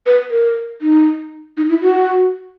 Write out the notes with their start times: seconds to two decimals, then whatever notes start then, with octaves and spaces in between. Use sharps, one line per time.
0.06 B4
0.31 A#4
0.82 D#4
1.57 D#4
1.70 E4
1.82 F#4